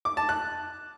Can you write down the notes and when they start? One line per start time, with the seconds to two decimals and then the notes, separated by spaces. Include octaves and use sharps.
0.05 D6
0.17 A5
0.29 F#6